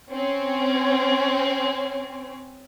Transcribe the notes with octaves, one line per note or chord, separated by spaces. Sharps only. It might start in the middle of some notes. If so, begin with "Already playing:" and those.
C4 C#4